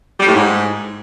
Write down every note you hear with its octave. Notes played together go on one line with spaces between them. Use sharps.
G3
A2
G#2